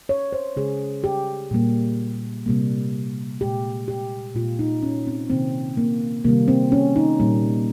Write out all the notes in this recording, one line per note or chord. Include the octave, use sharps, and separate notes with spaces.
C#5
C5
C#3 G#3 G#4
G4
A#2 G3 A#3
C3 G3 A#3
A#2 G#3 G4
G4
A#2 G#3 F4
D#4
C#4
C4
C3 D#3 A#3 C4
A#3
C3 D#3 G3 A#3
C4
C#4
D#4
A#2 G3 A#3